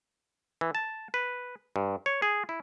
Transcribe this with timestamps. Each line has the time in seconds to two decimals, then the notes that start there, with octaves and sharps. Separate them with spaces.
0.61 E3
0.75 A5
1.14 B4
1.76 G2
2.06 C#5
2.22 G#4
2.49 E4